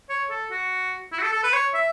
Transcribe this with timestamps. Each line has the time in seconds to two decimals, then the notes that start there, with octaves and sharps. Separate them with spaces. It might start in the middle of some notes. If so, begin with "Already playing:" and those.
0.10 C#5
0.31 A4
0.51 F#4
1.13 E4
1.19 F#4
1.23 A4
1.33 A4
1.44 B4
1.53 C#5
1.74 E5